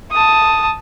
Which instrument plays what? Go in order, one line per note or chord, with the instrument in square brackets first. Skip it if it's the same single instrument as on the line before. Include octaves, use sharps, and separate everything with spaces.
[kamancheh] A5 D#6